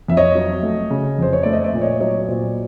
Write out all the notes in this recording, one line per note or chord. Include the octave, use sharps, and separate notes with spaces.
F2 E5
C#5 D#5
F#3
A3
C#3
F2 C5
C#5
A3 D5
D#5
D5 E5
A#2
C#5 D#5
F#3 C#5 D#5
A#2 C5 D5